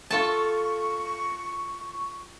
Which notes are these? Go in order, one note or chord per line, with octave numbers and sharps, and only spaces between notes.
F4 A4 A5 C#6